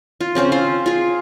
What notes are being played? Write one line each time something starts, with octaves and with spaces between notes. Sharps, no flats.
F4
C#3 C4 C#4 C5
F4 C5 F5
F4 G#4